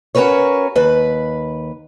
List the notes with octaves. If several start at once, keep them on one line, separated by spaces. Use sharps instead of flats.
C#4 F#4 A#4 B4 C#5
D#2 B4